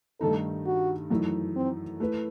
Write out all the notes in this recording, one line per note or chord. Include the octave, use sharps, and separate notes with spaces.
G2 D#3 A3 D#4 A4
F#4
F#2 E3 A3 D#4
C4
A3 E4 B4